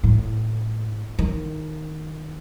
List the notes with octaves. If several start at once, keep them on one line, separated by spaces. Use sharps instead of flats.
A2
D#3